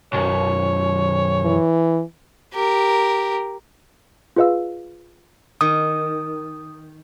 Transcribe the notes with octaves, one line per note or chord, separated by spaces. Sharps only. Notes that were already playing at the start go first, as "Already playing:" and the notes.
B1 F#2 C#5
E3
G4 A#4
F4 G#4 B4 D#5 F5 E6
D#3 D#6